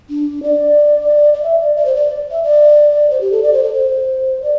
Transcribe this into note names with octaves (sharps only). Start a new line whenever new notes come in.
D4
D5
D5
E5
D5
D5
C5
D5
E5
D5
C5
G4
A4
D5
C5
A4
C5
D5